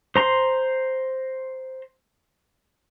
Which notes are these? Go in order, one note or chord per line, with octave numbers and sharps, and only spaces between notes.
C5 A#5 C6